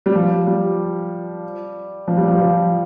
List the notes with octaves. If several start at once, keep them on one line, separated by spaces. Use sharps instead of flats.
G3
F3
G3
F3
G3
F3
F3